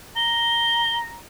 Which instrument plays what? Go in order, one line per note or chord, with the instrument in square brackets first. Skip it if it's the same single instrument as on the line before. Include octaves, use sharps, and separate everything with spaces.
[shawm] A#5 [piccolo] G7